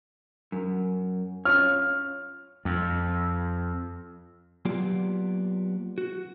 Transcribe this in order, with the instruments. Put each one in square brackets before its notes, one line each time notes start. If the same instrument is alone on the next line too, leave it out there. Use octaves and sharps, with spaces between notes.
[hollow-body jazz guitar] F#2
[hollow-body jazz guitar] C#4 F4 C#5 [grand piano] F6
[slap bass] F2
[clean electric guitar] F#3 A#3 B3 F4 G4 D5
F#4